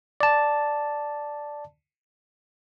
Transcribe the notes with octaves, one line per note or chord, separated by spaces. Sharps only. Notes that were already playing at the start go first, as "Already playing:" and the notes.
D5 A5